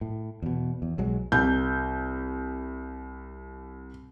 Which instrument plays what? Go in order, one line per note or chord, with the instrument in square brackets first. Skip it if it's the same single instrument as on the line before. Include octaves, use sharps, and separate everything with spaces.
[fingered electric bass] A2
E2 B2
E2
B1 F#3 G#3
[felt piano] C2 G6